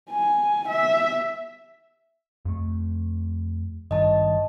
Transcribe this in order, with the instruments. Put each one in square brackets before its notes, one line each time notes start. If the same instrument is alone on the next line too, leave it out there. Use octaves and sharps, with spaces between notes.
[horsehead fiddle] G#5
E5
[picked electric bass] F2 A3
[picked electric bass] G#1 G2 D#3 [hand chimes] D#5 A5